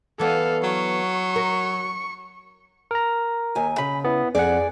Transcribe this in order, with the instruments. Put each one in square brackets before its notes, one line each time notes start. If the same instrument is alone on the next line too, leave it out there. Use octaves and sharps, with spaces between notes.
[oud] E3 B3 D5 [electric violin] A4 F5
[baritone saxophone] F#3 [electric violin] C#6
[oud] A#4
[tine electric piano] A#4 A#5
[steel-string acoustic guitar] D#2 G#5
[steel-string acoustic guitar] C#3 [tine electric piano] B5
[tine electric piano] B3 E4
[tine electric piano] F2 F#5 [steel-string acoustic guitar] G#4 D5